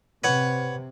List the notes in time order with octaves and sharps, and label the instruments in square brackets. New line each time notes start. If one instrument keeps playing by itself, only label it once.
[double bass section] C3 [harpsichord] B4 C#5 F#5